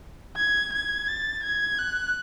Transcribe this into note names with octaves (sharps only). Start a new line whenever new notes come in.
G#6
G#6
A6
G#6
F#6